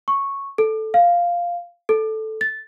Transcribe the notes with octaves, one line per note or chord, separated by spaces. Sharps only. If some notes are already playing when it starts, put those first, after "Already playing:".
C#6
A4
F5
A4
A6